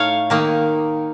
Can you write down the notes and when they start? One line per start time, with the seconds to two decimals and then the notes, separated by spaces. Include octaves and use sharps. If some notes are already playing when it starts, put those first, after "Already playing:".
Already playing: A2 A3 D#4 C#5 F5
0.30 D#3 A#3 D#4